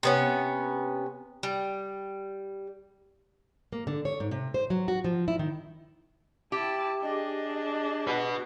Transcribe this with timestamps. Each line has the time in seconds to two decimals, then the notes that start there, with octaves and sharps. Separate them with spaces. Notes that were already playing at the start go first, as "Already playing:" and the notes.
0.03 C3 B3 C#4
1.43 G3
3.72 A#3
3.87 D3
4.05 C#5
4.20 G#2
4.31 C3
4.54 C5
4.70 F#3
4.88 F#4
5.04 F3
5.28 E4
5.39 D#3
6.52 E4 G4 A5
7.03 D4 G#4 D#5
8.07 F#4 B4